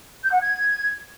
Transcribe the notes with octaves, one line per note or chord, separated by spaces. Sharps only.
G6
F#5
G#6